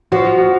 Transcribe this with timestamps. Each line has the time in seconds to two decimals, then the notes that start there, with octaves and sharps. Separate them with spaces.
0.12 F3 F#4
0.38 F#4